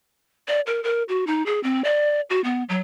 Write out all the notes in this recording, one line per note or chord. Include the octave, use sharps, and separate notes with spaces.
D5
A#4
A#4
F#4
D#4
G#4
C4
D5
F#4
B3
F#3